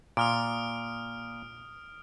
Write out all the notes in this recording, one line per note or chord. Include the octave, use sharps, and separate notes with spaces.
A#2 D#6 F6 D7